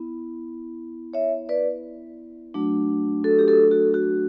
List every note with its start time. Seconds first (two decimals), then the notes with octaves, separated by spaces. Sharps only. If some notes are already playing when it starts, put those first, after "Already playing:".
Already playing: B3 E4
1.13 C#5 E5
1.49 B4 D5
2.54 F#3 A3 D4 F#4
3.24 F#4 A4
3.39 G4
3.48 F#4 A4
3.71 F#4 A4
3.94 F#4